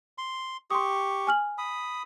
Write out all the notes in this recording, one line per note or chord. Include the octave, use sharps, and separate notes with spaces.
C6
G4 C6 C#6 D#6
G#5 F6 F#7
B5 D#6